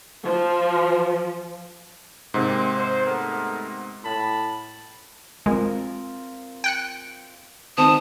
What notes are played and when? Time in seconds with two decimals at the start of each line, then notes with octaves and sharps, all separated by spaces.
0.24 F3
2.34 G#2 C3 A#3 C4
2.77 C5
3.06 A3 B3 A#4
4.04 A2 A5 B5
5.46 G#3 C4 F4 A#4
6.64 G5 F#6 C#7
7.78 D#3 C4 C5 A5 D#6